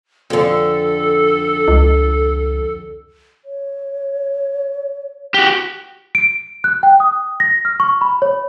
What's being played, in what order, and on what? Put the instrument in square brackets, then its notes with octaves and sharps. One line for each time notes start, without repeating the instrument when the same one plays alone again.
[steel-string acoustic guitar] F2 D3 [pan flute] A4
[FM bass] C#2
[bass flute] C#5
[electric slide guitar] F#4 G4
[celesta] D7
F#6
G5
D#6
A#6
F6
C#6
B5
C#5